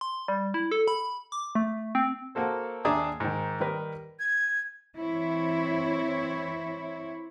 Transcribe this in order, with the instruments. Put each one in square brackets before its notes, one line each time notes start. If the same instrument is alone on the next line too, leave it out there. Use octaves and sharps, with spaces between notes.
[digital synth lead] C6
G3
E4
A4
B5
D6
A3
C4
[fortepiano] A#3 F#4 A4 C5
D#2 D4 G#4 E5 A#5 D#6
G#2 D#3
D#3 G3 A#4 B4
[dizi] G#6
[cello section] E3 C4 E4 C#5